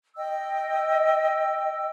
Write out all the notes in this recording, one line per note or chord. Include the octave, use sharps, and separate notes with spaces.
D#5 G5 E6